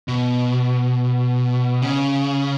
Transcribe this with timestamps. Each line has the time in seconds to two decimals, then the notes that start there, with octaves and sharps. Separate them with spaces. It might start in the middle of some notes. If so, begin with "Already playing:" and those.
0.08 B2
1.82 C#3